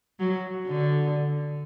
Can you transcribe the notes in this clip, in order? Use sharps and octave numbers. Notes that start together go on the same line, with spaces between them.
F#3
D3